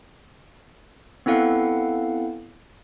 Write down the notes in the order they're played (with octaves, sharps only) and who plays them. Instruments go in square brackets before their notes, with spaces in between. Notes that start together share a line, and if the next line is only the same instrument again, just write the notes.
[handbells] B3 C4 E4 A4 F5 F#5